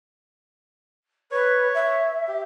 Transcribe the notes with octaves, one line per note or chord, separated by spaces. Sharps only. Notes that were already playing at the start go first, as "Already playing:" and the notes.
B4 C#5
E5
G4